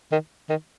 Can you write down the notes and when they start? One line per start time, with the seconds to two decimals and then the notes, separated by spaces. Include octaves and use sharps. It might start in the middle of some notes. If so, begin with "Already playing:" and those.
0.12 D#3
0.49 D#3